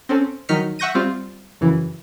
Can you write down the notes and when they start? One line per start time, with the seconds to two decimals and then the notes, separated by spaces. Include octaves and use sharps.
0.09 C4 C#4 A4
0.49 D#3 F#3 D#4 F6 B6 C#7
0.79 E5 F#5 C#6 G6 A#6 D#7
0.95 G3 C4 F4
1.61 F#2 C#3 E3